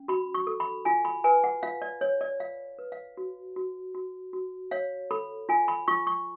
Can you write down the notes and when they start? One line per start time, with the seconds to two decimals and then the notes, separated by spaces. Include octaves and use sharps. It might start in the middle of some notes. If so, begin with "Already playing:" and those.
Already playing: C#4
0.08 F#4 B5
0.34 C#6
0.47 A4
0.60 B5
0.85 F4 G#5
1.05 B5
1.24 B4 G#5
1.44 F#5
1.63 F4 F5
1.82 D5
2.01 C#5
2.21 D5
2.40 F4 F5
2.79 B4
2.92 F5
3.17 F#4
3.56 F#4
3.95 F#4
4.33 F#4
4.71 C#5 F5
5.11 A4 B5
5.49 F4 G#5
5.68 B5
5.88 F4 C#6
6.07 C#6